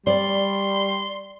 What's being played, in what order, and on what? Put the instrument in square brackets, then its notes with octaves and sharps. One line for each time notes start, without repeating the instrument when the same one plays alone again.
[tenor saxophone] G3 [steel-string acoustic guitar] D5 [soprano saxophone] C6